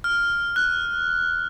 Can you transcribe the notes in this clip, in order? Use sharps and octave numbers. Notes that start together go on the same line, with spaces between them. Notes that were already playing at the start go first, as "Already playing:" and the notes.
F6
F#6